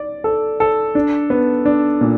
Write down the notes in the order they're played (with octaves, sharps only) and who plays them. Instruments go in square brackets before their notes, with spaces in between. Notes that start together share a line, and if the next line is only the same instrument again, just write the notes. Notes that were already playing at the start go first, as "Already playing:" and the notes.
Already playing: [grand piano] D5
A4
A4
D4
B3
D4
A#2